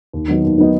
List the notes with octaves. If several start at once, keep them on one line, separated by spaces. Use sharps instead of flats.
D#2
D#3 F#3 B3 D#4
D#2
D#3 F#3 B3 D#4